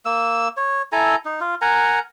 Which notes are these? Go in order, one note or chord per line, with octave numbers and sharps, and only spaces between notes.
A#3 E6
C#5
E4 A4 G#5 A#5
D#4
F4
A#4 F#5 G#5 A#5